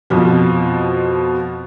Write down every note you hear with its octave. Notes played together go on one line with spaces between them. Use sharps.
F2 B2 F3